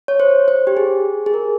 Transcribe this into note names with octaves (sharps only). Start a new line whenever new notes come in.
C#5
C5
C5
G4
G#4
G#4
A#4